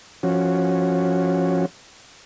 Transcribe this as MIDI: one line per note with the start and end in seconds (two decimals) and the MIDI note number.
0.23 1.66 53
0.23 1.66 61
0.23 1.66 66